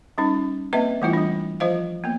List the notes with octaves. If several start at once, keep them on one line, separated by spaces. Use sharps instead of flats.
G3 C#4 D#4
A#3 C4 B4 D#5 E5
E3 G3 A3 B3 E4 F4
G3 D4
F3 F4 C5 D#5 F5
A#3 B3